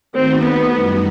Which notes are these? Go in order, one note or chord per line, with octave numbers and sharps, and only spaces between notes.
D#3 A3 C4 D#4 F#4
B3
F#2 E3 G3 D#4 F#4